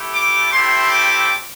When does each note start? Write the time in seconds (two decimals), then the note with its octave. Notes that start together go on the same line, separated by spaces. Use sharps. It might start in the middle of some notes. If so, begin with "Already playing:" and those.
Already playing: A3 E4 G4
0.11 D6
0.51 A3 C4 E4 G4 C6
0.90 D6